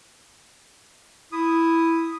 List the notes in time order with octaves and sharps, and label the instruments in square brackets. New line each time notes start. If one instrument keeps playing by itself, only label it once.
[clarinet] E4 [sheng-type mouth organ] D#6